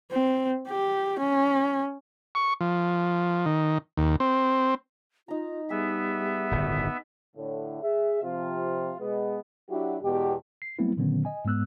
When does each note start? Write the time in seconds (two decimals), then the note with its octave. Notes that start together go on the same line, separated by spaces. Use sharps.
0.11 C4
0.68 G4
1.19 C#4
2.35 C#6
2.61 F3
3.46 D#3
3.97 D#2
4.20 C4
5.28 D#4 F4 A#5
5.70 G3 B3 G#4 E5
6.51 D1 G1 D#3
7.37 A2 D3
7.82 G#4 E5
8.23 C3 F3 F4
9.00 B2 G#3 B3
9.69 F#3 D4 E4 F#4 G4
10.01 E2 B2 G#3 G4
10.62 C7
10.79 F#3 G3 A3 B3 C4 E4
10.97 A#2 D3 D#3 F#3 B3 C#4
11.25 D#5 G#5
11.45 G#2 G#3 B3 E6 F#6